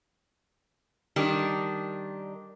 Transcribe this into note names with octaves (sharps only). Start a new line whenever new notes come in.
D#3 G3 D4